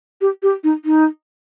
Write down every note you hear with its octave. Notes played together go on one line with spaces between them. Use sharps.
G4
G4
D#4
D#4